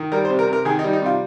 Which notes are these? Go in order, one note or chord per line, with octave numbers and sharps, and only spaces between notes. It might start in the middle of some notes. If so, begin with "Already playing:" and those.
Already playing: D#3
G3 A#4
C5
C3
A#4
C3
A#4
D#3 G#4
D#4
G3
D#4
C3 F4